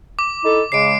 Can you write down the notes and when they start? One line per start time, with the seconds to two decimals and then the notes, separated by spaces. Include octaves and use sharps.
0.19 D6
0.44 D#4 E4 A4
0.72 C#3 G#3 C7 D7